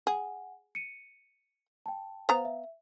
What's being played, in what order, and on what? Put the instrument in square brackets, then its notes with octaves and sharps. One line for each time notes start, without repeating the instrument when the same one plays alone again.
[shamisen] G#4 [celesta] F#5 G#5
[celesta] C#7 D#7
G5 A5
[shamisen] B3 F5 A#5 [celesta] C5
[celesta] E5